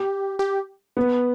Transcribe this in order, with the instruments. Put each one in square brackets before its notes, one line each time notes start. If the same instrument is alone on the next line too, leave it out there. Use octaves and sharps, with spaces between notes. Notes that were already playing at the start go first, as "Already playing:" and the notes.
Already playing: [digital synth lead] G4
G4
[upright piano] B3